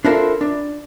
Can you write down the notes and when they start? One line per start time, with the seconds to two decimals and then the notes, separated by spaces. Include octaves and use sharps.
0.05 D4 E4 F4 A4 A#4 C5
0.41 D4